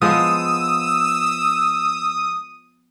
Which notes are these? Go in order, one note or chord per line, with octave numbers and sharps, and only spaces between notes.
F3 G#3 B3 D#6 E6